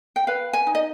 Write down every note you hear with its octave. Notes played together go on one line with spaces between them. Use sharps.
G5
B4 F5
G#5
D#4
D#5